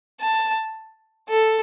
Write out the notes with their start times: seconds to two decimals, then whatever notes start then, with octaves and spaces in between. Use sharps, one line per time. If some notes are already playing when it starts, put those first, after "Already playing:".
0.21 A5
1.29 A4